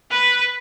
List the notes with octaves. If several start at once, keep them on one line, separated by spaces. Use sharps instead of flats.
B4